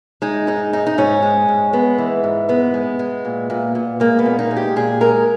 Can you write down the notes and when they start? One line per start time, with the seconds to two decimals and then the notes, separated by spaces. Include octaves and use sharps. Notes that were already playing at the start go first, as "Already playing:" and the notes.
0.22 G#3 D#4
0.47 G#2 D#4
0.73 G#2 D#4
0.87 D#4
0.98 G#2 C#4
1.22 G#3
1.48 G#2
1.73 G#3 B3
1.98 E3
2.24 G#2
2.48 G#3 B3
2.74 G#3
2.99 G#3
3.25 A#2
3.50 A#2
3.75 A#2
4.00 G#3 A#3
4.19 B3
4.26 A#2
4.39 D#4
4.51 G#3
4.56 G4
4.76 A#2 G#4
5.01 G#3 A#4